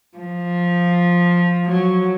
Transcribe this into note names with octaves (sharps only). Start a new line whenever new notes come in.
F3
F#3